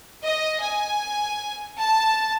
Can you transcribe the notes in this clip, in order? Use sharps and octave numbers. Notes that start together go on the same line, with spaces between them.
D#5
G#5
A5